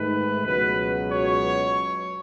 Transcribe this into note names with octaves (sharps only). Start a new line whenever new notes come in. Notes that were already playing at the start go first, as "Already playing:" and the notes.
Already playing: G#2 D#3 A3 B4
C#2 B2 F#3 B4
C#5